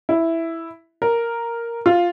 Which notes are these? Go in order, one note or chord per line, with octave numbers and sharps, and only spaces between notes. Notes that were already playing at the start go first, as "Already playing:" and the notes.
E4
A#4
F4